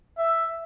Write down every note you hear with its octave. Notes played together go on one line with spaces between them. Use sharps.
E5